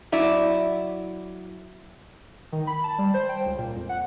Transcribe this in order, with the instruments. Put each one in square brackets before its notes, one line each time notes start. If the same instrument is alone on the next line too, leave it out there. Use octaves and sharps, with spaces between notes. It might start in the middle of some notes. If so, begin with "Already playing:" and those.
[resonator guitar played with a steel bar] F#3 E4 D5
[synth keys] D#3
B5
A5
G3
C5
G5
C#2
A#2
F2
F#5